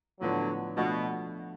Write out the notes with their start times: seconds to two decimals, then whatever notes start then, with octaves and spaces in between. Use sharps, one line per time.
0.21 A2 D3 F3 F#3 B3 D4
0.77 B2 F3 A3 D4 F#4